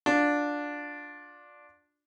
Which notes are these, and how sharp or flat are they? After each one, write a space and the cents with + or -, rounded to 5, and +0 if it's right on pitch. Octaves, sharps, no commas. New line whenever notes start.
D4 +0 F4 +30